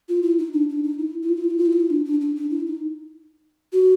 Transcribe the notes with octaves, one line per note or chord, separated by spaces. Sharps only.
F4
E4
D#4
D4
D4
D#4
E4
E4
F4
E4
F4
E4
F4
E4
F4
E4
D4
D4
D4
D4
E4
D#4
F#4